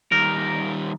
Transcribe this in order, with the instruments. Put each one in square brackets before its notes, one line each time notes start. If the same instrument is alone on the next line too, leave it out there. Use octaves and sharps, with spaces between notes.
[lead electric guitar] D#3 G3 [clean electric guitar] A#4